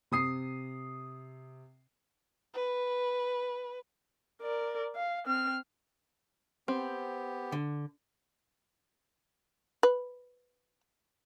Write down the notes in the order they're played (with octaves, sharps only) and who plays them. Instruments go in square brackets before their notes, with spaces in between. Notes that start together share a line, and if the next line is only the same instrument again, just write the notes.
[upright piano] C3 D#6 C7
[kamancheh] B4
A#4 D5
F5
C4 F6
[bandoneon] B3 G4 [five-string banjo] C4
[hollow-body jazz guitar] D3
[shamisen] B4